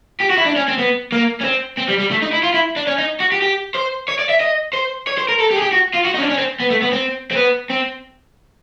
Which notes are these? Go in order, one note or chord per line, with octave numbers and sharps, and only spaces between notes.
G4
F#4
E4
D4
C#4
C4
B3
A#3
C#4
C4
C4
G3
G3
A3
D#4
E4
F4
E4
D4
C#4
D#4
F#4
G4
G4
C5
C#5
D5
E5
D#5
C5
C#5
C5
A#4
A4
G4
G#4
G4
F#4
F4
F#4
D#4
C#4
D4
C#4
C4
B3
A3
B3
C4
C4
B3
C4